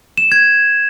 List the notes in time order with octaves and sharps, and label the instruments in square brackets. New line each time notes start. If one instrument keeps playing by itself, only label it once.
[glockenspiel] E7
G#6